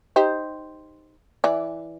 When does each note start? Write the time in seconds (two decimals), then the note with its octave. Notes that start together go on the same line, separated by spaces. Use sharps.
0.16 D#4 G4 C5
1.44 E3 D5